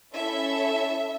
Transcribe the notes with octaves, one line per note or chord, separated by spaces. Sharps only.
C#4 E4 A4 E5